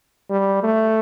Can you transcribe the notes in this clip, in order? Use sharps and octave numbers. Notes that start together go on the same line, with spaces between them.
G3
A3